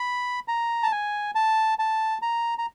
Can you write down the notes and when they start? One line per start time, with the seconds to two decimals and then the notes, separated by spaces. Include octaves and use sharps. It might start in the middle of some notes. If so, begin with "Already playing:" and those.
Already playing: B5
0.48 A#5
0.83 A5
0.92 G#5
1.35 A5
1.79 A5
2.22 A#5
2.58 A#5